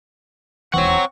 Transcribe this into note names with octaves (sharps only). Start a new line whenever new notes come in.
E1 D#2 E3 C4 C#5 F#5 C#6